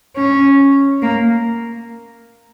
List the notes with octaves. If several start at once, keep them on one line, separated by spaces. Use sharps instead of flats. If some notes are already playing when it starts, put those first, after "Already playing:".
C#4
A#3